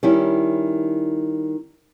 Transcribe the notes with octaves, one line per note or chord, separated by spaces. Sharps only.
D#3 G3 C#4 E4